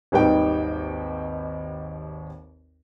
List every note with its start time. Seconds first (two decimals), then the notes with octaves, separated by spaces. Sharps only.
0.12 G#1 D#2 G3 D#4 B4 G5